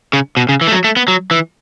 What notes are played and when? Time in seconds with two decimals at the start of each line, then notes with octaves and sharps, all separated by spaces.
0.13 C#3
0.37 B2
0.49 C#3
0.61 E3
0.68 A3
0.72 F#3
0.84 A3
0.96 B3
1.08 F#3
1.31 E3